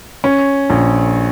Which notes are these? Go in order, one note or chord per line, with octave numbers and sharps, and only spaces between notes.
C#4
A#1